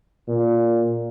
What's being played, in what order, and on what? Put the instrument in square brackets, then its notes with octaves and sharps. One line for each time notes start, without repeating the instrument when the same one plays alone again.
[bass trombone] A#2